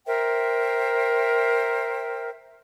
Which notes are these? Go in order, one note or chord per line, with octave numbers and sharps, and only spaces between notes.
A#4 C5 E5 G5